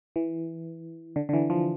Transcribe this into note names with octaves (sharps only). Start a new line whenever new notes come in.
E3
D3
D3
E3
F3